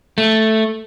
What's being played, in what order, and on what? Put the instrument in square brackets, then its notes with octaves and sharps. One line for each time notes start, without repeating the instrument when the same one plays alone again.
[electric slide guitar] A3